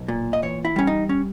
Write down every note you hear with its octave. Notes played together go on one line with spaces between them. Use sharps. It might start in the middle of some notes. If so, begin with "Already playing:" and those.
Already playing: B1
A#2
D#5
E2 C#5
E4
G3 C#4
D#4
C#4